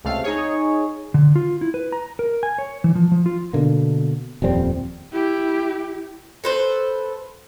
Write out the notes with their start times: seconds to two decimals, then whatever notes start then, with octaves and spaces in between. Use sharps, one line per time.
0.04 C#2 C3 A3 F5
0.24 D#4 G#4 C#5
1.14 D3
1.36 F4
1.61 E4
1.74 B4
1.92 A#5
2.19 A#4
2.43 G#5
2.58 C#5
2.84 E3
2.95 F3
3.12 F3
3.26 F4
3.53 B2 D3 A#3
4.42 D#1 F2 G3 C4
5.13 E4 G4
6.44 A4 B4 C5